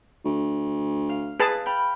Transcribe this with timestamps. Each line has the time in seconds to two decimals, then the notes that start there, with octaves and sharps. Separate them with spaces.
0.25 D2
1.09 F5
1.40 G#4 B4 A5
1.66 G5 B5 F6